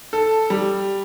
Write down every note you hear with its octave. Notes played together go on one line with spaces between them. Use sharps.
A4
G3